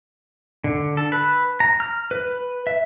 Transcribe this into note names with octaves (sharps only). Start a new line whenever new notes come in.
D3
A4
B4
A#5
F6
B4
E5